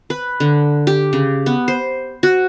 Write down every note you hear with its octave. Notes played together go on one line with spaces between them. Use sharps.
B4
D3
G4
C#3
B3
C5
F#4